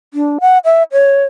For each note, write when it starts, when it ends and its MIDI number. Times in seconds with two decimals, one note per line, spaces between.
0.14 0.38 62
0.41 0.58 78
0.65 0.83 76
0.92 1.24 73